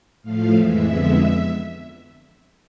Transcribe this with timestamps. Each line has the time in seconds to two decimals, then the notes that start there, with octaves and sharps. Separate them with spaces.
0.22 A2 F3 A3 F5
0.54 F2 E3 G#3 E5
0.87 F2 D3 G#3 B3